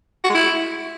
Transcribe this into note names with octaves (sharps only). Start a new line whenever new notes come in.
F#4
G#3
E4